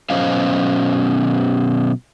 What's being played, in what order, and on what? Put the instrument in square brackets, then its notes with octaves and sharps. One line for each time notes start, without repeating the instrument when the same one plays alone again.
[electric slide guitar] B2 F#3 C#4 C5 D#5 F5